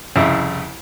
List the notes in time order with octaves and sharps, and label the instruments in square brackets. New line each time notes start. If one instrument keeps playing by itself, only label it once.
[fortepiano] C2 F2 C#3 E4